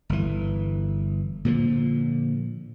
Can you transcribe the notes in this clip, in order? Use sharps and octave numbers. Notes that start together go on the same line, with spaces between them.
G1 E3
A#2 D3 F3